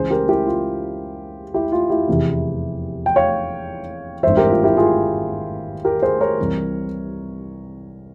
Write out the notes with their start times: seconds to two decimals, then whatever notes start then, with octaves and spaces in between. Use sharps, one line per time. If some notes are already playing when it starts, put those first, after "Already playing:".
Already playing: C#2 C#3 E3 G#4 C5
0.10 G4 A#4
0.28 E4 G4
0.47 F4
1.54 E4 G4
1.72 F4
1.90 E4 G4
2.08 F1 E2 C3 E3
3.06 G5
3.16 C#5 F5
4.23 G#1 G2 E3 C5 E5
4.37 G4 A#4
4.50 F4
4.63 E4 G4
4.77 F4 G#4
5.85 G4 A#4
6.03 G#4 C5
6.21 A#4 C#5
6.39 C2 C3 E3